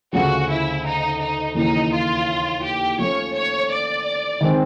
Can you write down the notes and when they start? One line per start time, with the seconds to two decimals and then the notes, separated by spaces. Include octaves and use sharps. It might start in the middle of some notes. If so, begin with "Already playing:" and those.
0.13 D2 C#3 F3 F#4
0.48 E4
0.84 D#4
1.20 D#4
1.55 D#2 C#3 E3 D#4
1.91 F4
2.63 G4
2.98 F3 A3 C#4 C#5
3.34 C#5
3.70 D5
4.41 D#3 G#3 C4